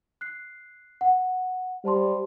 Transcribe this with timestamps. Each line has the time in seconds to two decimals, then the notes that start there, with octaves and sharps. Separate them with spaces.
0.21 F#6 C7
1.01 F#5
1.85 G3 C5 A5 C6